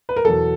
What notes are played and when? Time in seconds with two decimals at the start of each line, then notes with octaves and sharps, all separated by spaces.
0.09 B4
0.16 A#4
0.25 E2 B2 F#3 A4